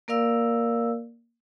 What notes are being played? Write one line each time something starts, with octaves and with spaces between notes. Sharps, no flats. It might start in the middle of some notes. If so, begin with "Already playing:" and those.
A#3 A#4 D5 F5 E6